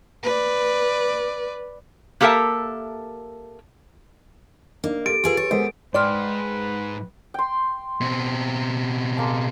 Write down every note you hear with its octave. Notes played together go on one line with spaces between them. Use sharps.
B4 D5
A#3 G4 A4 A#4 E5 A5
A#3 D4 D#4
G4 A4 A6 D7
F4 G4 G#4 A#4 B4
C#5 A6
G#3 B3 A4 A#4 C5
G#2 B4 D5 G5 C6 F6
G5 C6
B2 C4
G#3 A#3 A5